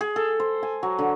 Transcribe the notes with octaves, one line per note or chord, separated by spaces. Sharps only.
G#4
A4
C5
G#5
F#3
D3